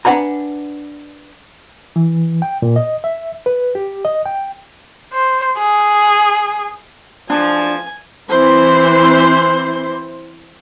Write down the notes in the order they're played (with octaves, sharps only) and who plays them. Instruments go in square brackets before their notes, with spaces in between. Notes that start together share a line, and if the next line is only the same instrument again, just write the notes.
[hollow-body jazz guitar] D4 B4 F#5 G#5 A#5
[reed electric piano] E3
G5
A#2
D#5
E5
B4
G4
D#5
G5
[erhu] C5
G#4
[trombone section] A1 F3 [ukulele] D4 [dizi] D5 [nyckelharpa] G#5
[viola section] E3 C4 E4 C5